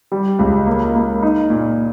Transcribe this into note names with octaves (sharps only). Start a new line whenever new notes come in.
G3
C#2
A#3
A#3
D#4
A#2